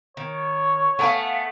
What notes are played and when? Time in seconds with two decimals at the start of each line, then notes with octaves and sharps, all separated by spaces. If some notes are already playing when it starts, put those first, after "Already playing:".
0.17 D#3 C#5
0.99 A3 B3 F5 G5 G#5